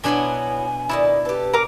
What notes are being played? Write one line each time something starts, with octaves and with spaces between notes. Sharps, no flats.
B2 E3 F#3 B3 D4 G#5 C6
D#3 F#3 E4 D5
G4 A4 B4
A#4 F5 D6